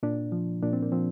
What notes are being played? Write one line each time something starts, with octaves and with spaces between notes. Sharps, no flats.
A#2 D4
F3
A#2 D4
C4
A#3
F3 C4